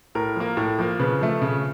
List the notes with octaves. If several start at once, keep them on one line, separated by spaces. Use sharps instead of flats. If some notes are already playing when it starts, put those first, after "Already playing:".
A2 A#4
F3 A#3
A2
F3 A#3
C#3 B4
F3 A3
C#3